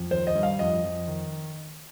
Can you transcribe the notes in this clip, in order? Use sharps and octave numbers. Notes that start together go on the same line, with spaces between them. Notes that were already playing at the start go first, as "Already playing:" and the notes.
Already playing: F2
D#3 C5
D#5
G2
F5
F2 D#5
F2
D#3